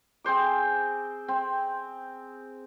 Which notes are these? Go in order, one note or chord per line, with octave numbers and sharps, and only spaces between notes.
C4 G#4 C5 D6
C4